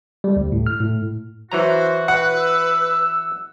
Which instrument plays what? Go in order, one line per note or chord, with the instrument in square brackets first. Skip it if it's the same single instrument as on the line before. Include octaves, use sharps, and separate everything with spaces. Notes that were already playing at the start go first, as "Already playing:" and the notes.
[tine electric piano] G3
D2
A2
F6
A2
[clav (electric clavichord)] E3 F#3 A#5 [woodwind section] F#4 [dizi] C5
[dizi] B4 [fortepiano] F#5
[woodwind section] E6